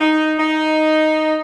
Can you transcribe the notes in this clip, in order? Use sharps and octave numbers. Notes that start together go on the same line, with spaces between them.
D#4
D#4